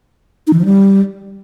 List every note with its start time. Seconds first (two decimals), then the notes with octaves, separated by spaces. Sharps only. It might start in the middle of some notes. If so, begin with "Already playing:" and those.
0.47 D#4
0.53 E3
0.59 F3
0.65 G3